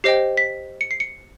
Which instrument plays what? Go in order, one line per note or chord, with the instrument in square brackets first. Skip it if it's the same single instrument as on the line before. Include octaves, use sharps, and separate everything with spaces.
[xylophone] G4 C5 D#5 G5 C7
B6
C#7
C7
C#7